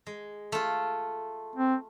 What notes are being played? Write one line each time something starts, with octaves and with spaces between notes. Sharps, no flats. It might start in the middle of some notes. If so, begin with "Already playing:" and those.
G#3
A3 F4
C4